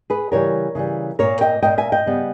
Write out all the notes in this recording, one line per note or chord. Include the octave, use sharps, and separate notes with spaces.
G#4 B4
C#3 E3 G3 A#4 C#5
C#3 E3 G3
A#2 A#3 A#4 C#5
D#5 G5
A#2 A#3 D#5 G5
E5 G#5
D#5 G5
C#3 G3 B3